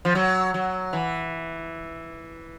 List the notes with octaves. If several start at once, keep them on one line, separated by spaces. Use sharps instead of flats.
F3
F#3
F#3
E3